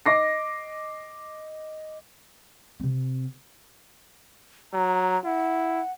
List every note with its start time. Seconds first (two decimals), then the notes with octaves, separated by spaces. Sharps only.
0.06 D#5 D6 A#6 C7
2.80 C3 C4
4.73 F#3 A#5
5.24 E4 F#5